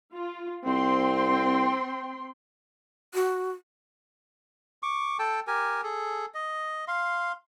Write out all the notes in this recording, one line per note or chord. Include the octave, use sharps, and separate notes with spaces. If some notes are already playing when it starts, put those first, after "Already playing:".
F4
C2 C4 G5 C6
F#4
C#6 D6
A4 G5 A5
G4 A#4 G#5
G#4 A4
D#5
F5 C6